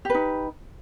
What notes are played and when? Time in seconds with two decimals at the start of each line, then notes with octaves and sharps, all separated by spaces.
0.05 G4
0.10 B4
0.14 D#4